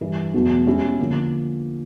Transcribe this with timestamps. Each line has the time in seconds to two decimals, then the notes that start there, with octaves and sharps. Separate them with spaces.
0.01 G2 E3 G3
0.34 E2 B2 F#3 A3
0.66 B2 G#3 C#4 E4 G4
0.99 D3 F3 A#3